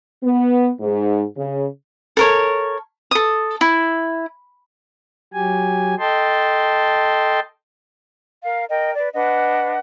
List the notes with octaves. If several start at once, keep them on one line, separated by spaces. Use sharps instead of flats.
B3
G#2
C#3
A4 A#4 C#5
A4 D#6
E4
F#3 G4 G#5
A4 D#5 G5 A5 C6
A#4 F5
A#4 D#5 G5
B4 D5
D4 B4 D#5 F#5